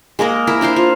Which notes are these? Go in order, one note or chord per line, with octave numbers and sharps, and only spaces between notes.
G#3 A#3 G#4 A#4
E4 A#4 E5
D4 E4 C5 F5
F4